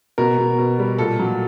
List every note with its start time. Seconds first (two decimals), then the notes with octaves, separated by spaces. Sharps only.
0.18 B2 A#4
0.38 B2
0.59 B2
0.79 G3
0.98 A#2 A4
1.19 F#3